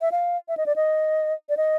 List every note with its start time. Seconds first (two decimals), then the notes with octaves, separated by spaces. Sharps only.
0.02 E5
0.12 F5
0.49 E5
0.57 D#5
0.66 D5
0.76 D#5
1.49 D5
1.57 D#5